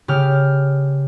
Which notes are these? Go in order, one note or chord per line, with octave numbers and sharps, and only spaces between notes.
C#3 G4 F6